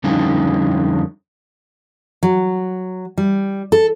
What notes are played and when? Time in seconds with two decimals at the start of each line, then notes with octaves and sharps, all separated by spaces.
0.04 F2 D3 G3 C#4 D#4 F4
2.23 F#3
3.18 G3
3.72 A4